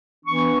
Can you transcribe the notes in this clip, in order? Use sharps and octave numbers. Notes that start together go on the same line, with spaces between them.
E3 B3 D4 C#6